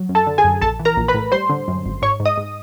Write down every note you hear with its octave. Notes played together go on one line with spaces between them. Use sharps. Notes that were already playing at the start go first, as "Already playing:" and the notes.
Already playing: F#3
F#2
A4 A5
D3
G#4 G#5
F#2
A#1 A4 A5
E3
A#4 A#5
A#1
B4 B5
A2
G3 C5 C6
D3
F#2
G#1
G#2 C#5 C#6
G#2
D#5 D#6
G#2